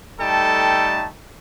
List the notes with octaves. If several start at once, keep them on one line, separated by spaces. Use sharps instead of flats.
G3 A3 D#4 A4 G5 A5